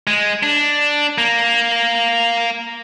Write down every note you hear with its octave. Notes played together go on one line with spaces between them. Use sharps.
G#3
D4
A#3